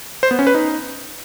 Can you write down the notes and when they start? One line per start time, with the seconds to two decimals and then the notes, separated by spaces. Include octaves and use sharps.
0.23 C5
0.31 B3
0.39 C#4
0.47 B4
0.55 D#4